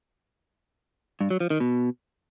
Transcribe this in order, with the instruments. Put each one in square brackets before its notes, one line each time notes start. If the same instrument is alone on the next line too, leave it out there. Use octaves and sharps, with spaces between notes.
[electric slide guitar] G2
F#3
F3
D#3
B2